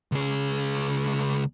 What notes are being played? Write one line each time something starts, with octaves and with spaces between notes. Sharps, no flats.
C#2 G#4